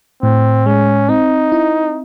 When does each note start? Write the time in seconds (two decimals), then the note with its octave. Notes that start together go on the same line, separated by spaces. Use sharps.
0.23 A2 C4
0.66 G#3 C#4
1.09 C4 D#4
1.52 E4